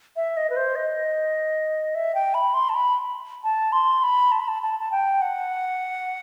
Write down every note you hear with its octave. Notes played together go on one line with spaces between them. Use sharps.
E5
D#5
B4
C5
D#5
E5
G5
B5
C6
A5
B5
A5
C6
B5
A5
B5
A5
A5
A5
G5
F#5